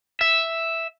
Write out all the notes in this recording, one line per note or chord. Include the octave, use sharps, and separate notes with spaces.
E5